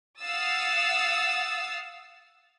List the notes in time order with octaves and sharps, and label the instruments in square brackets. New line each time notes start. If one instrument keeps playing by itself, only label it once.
[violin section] F5 F#5 D#6 E6 A6